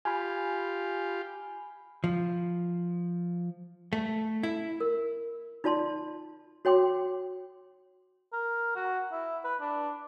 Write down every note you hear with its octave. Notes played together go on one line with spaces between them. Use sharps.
F4 G4 G#5 B5
F3
A3
E4
A#4
D#4 F4 D5 A5 C6
F#4 C#5 G5 C6 D6
A#4
F#4
E4
B4
D4